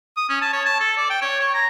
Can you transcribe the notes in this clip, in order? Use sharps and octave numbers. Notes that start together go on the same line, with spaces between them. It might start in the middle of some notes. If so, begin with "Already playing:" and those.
D#6
C#4
A5
C#5
A5
A4
D5
G5
C#5
C#5
A#5